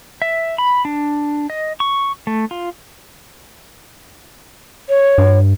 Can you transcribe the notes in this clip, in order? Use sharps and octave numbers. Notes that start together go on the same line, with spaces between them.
E5
B5
D4
D#5
C#6
A3
F4
C#5
G2